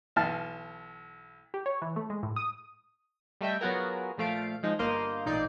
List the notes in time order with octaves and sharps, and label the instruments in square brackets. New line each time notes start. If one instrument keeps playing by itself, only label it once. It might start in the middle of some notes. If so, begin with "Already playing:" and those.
[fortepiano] B1 E3 A5 F6
[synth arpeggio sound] G4
C#5
E3
A3
G#3
A2
D#6
[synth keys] G3 A3 D#5 E5 G5
F#3 B3 F4 F#4 G#4 A#4
A#2 F3 A3 F5 D7
F3 G#3 D#4
G1 A#3 D#5 F5 C6 G6
A1 A#2 D#4 D5 G6 C7